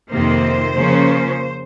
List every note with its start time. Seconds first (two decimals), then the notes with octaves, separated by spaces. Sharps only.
0.11 F2 C3 D#3 A#3 C5
0.75 C#3 F3 A#3 C#4